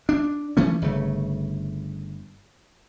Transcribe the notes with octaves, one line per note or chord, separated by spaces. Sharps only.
D4
E3 A3 C#4
G1 C#3 A3